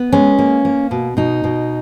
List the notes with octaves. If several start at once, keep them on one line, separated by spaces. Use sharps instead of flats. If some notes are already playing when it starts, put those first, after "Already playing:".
Already playing: B3
G#3 C#4
A#3
A#3
B2
B2 D#4
B2